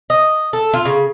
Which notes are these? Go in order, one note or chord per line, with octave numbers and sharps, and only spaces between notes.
D#5
A4
F4
C#3